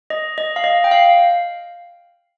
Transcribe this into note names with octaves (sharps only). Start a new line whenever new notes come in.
D#5
D#5
F5
D#5
G5
F5